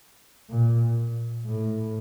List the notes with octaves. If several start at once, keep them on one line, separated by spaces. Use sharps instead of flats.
A#2
A2